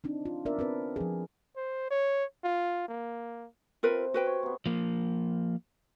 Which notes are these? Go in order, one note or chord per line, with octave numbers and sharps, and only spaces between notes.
C4 D4 D#4
F4
B3 D4 A#4 D5 E5
C4 A#4 B4
F3 G#4
C5
C#5
F4
A#3
C3 C4 F4 A#4 B4
F#4 B4 G5
C#5
C3 B3
F3 A#3